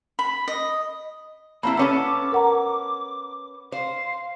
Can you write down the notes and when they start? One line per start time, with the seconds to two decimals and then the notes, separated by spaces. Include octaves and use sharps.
0.19 B5
0.48 D#5
1.63 A#3 C4 E4 A5 B5
1.77 B3 C#4 A4 D6
2.32 A#4 F#5 A#5
3.72 C5 F5